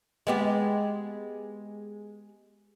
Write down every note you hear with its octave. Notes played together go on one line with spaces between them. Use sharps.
G#3 B3 G4